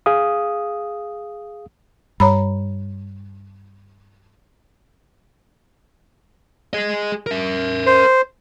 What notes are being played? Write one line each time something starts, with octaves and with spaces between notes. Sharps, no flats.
G#4 F5 D#6
G2 C#5 A#5 B5
G#4 D#5
A#4 E5
C5